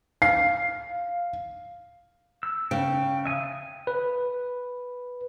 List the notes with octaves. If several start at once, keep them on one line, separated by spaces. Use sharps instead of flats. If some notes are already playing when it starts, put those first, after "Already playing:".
F5 C7
E6
C#3 G5
E5 G#5 D#6
B4